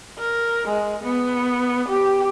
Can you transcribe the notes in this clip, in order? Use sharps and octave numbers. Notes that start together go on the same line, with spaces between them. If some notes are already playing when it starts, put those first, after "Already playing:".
A#4
G#3
B3
G4